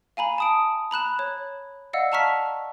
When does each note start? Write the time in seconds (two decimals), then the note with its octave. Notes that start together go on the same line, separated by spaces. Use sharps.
0.17 F5 G#5 A#5 B5
0.38 A5 D#6 D7
0.91 A#5 B5 F#6 E7
1.19 C#5
1.93 D5 D#5 F5 F#5 E6
2.12 F5 A5 A#5 C#6 F6 B6